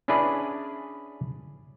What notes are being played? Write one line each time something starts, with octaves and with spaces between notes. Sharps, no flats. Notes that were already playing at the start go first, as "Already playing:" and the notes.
C#4 D4 E4 G#4 B4 D5